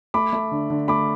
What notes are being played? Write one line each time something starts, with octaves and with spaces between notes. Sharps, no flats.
A3 B5 D6
A3
D3
D3
A3 B5 D6